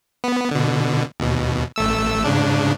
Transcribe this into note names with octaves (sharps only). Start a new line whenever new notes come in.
B3
B2 D3
D#2 B2
A1 A3 E6
G#2 C#3 D4